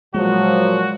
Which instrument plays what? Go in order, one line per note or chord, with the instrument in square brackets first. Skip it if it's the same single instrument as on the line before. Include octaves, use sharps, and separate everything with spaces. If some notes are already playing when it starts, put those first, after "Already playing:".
[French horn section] A#2 F3 F#3 [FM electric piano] G#3 [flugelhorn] F#4